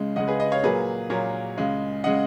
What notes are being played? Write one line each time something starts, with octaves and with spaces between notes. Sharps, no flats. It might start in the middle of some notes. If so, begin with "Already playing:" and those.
Already playing: C#2 C#3 G#3
C#2 C#3 G#3 D#5 F#5
G#4 B4
B4 D#5
C#5 F5
A#2 F#3 A#3 G#4 B4
A#2 F#3 A#3 A#4 C#5
C#2 C#3 G#3
C#3 G#3 D#5 F#5